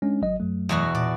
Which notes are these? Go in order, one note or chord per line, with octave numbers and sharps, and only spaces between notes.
G#3 C#4 D4
G#1 F#3 D#5
F#2 F#3 A3
E2 B2 F#4
A#2 D5